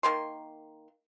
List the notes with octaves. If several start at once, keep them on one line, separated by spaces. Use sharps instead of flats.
D#3 A#3 C6